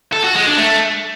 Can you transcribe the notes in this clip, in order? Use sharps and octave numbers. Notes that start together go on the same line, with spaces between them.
A4
F#4
G#3
D4
A3